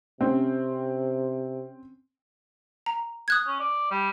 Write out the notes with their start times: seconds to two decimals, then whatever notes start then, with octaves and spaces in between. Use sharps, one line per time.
0.21 C3 C4 C#4
2.86 A#5
3.28 D#6 F#6 G#6
3.46 C#4
3.60 D5
3.91 G3